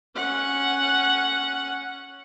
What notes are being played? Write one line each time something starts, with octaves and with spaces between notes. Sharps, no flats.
C#4 F#5